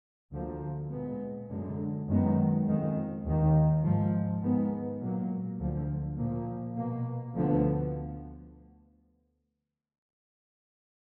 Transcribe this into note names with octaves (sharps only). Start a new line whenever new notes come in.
D2 D3 F3 A#3
A#2 G#3 B3
F#2 D3 G#3
F#2 D#3 G#3 B3
F2 D#3 G#3
D#2 D#3 A#3
G#2 F3 G#3
G#2 D#3 G#3 B3
A#2 F#3 A#3
D2 D3 F3
A#2 F3 A#3
B2 A#3
D2 D3 F3 B3